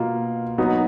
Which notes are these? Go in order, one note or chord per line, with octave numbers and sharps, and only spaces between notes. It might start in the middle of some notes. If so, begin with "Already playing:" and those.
Already playing: B2 A#3 F4
F#3 B3 D#4 F#4